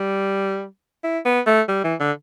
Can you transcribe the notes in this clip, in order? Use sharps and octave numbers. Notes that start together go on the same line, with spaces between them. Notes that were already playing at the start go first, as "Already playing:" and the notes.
Already playing: G3
E4
B3
A3
G3
E3
D3